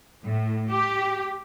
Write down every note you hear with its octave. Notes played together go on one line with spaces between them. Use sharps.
A2
G4